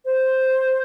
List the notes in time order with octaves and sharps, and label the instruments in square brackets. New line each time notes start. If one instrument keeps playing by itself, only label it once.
[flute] C5